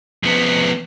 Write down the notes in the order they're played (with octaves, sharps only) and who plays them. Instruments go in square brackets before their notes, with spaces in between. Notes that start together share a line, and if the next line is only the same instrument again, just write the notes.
[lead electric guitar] F2 B3